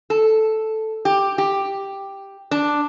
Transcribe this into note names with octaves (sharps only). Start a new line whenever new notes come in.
A4
G4
G4
D4